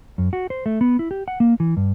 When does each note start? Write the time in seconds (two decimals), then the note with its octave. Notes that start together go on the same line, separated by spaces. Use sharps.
0.18 F#2
0.33 F#4
0.50 C5
0.66 A3
0.81 B3
0.99 E4
1.11 G4
1.28 F#5
1.40 A#3
1.60 E3
1.77 G2